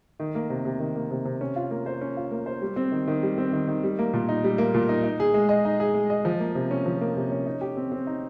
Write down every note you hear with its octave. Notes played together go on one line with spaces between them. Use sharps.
D#3
A#3
C3
C3
D#3
A#3
C3
C3
C#4
F4
A#3
C5
C#4
F4
A#3
C5
G3
C4
D#3
D#3
G3
C4
D#3
D#3
G3
A#3
A#2
D#4
G3
A#3
A#2
D#4
D#4
G#4
G#3
D#5
D#4
G#4
G#3
D#5
F3
A#3
C3
C#4
F3
A#3
C3
C#4
D#4
G4
C4
C4
D#4